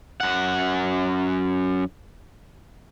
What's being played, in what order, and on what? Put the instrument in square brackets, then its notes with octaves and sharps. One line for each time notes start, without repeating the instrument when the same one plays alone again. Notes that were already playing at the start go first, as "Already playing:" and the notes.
[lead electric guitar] F#2 F#5